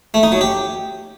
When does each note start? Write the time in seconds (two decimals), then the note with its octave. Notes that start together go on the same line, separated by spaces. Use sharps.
0.14 A3
0.23 D#4
0.32 F#3
0.41 G4